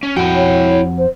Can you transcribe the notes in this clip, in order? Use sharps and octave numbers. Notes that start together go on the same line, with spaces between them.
C#4
F2 E4 F#4 G5
C#5
C5